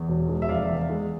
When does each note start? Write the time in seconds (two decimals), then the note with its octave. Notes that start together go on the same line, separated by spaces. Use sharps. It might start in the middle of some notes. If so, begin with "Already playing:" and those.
Already playing: E2
0.08 E1
0.29 G#3
0.42 E5
0.49 F1 D5 F5
0.69 E2
0.90 G#3